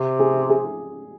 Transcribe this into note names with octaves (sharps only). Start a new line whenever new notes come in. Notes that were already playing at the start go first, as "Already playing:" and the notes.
Already playing: C3
G#4
G#4